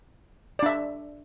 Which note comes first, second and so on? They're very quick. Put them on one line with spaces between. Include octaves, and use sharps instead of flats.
D5 D4 E5